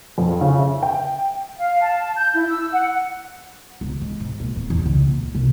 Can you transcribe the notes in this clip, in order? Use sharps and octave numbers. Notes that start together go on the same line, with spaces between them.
F2
C#3
E5
G5
F5
A5
G6
E4
E6
F#5
C#2
G#3
G#2
A#2
D1
E2
C#2
A#2
C2